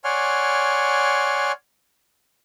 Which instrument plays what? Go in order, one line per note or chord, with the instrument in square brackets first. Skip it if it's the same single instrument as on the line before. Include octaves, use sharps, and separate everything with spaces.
[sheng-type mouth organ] C#5 D5 F#5 G#5 C6 F6